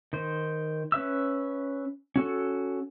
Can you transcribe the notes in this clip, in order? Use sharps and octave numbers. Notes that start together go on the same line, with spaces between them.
D#3 C5
C#4 B4 E5 E6
C#4 F#4 A4